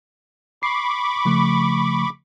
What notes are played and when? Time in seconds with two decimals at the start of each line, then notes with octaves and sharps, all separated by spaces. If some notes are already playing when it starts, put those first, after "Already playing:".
0.63 B5 C#6 D6 C7
1.25 C#3 F3 A3